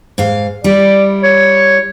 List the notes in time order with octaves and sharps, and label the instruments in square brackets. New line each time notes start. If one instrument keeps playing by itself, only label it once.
[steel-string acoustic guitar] G#2 F5
[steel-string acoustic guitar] G3 E4 [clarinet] D5
[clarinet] C#5